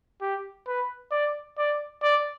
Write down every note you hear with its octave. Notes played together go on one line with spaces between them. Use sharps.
G4
B4
D5
D5
D5